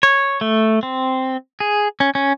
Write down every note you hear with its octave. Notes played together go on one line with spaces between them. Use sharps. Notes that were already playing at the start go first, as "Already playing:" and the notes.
C#5
A3
C4
G#4
C#4
C#4